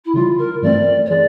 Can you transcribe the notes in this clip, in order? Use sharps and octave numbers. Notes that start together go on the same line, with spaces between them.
E4
C#3 E3 G3 F4
A#4
G2 E3 A3 C4 D5
C#5
E3 G#3 D5